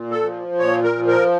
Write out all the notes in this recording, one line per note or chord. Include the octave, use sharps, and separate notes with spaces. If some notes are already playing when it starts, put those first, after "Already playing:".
Already playing: A#2
A4
F3
A#2 C#5
A#4
F3
A#4